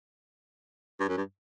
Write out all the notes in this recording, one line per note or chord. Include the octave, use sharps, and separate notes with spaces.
G2
F#2
G2